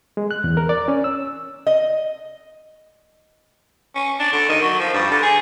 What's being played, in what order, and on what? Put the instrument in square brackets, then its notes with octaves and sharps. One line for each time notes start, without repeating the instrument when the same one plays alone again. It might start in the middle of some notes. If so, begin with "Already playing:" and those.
[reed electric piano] G#3
F#6
E2
A#4
D5
C#4
E6
[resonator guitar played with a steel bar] D#5
[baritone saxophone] C#4
D4
D3
D#3
F#3
F3
G2
D3
G#4